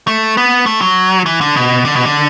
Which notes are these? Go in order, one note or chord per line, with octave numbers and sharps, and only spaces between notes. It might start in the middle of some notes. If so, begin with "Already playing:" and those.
A3
B3
A3
F#3
E3
D3
B2
D3
B2
D3